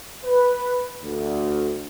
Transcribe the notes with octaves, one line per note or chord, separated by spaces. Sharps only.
B4
D2